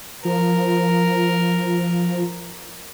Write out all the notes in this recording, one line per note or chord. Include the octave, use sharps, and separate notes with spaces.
F3 A#4